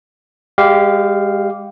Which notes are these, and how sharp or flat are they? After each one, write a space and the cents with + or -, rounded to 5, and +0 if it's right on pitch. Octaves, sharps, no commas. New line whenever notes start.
G#3 -35 G4 -10 F5 +0